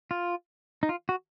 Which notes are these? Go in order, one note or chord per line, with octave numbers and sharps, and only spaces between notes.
F4
D#4
F4
F#4